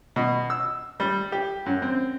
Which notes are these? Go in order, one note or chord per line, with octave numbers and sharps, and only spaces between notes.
B2
E6
G3
G4
F#2
C4